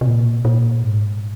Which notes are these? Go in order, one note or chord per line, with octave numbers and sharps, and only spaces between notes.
C3
A#2
A#2
G#2